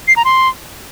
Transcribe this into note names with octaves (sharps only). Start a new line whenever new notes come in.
C7
A#5
C6